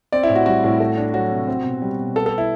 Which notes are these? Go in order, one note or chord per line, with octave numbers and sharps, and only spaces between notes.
C4 D5
E4
A2
F#4
G3 F#4
A2
A3
D4
F#3 F#4
C3
C4
B2
G3
B2
B3 A4
A4
E4